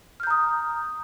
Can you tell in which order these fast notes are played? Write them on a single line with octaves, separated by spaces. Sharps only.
F6 G6 A#5 D#6